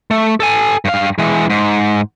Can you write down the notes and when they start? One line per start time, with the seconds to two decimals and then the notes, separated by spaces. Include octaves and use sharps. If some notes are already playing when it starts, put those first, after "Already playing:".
0.11 A3
0.40 A4 G#5
0.85 G2 F5
1.19 E3 G#3
1.50 G#2